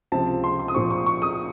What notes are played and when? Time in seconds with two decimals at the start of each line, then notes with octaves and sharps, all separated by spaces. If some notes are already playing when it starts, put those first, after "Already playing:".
0.12 C#2 C3 F3 C4 A5
0.44 C6
0.59 C6
0.68 D#6
0.74 A#2 F3 C4 C#6
0.90 C#6
1.06 C#6
1.22 D#6